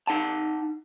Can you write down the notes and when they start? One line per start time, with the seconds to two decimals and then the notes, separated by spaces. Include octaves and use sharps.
0.07 D#4 F#5 A5